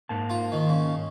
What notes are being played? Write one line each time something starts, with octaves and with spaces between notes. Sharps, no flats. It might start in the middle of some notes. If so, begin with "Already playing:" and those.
G#2 A#3 A5
F4
D#3
C#3